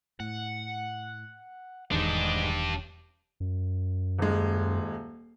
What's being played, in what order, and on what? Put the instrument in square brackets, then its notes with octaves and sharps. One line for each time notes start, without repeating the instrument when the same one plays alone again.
[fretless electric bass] A2 [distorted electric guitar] F#5
[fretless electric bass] E1 E2 D#3 [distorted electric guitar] G#3 D#4 [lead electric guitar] D4 G4
[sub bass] F#2
[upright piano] D#1 G#3